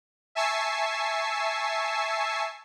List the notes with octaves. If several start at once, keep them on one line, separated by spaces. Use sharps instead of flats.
E5 G#5 A5 C#6 E6 C7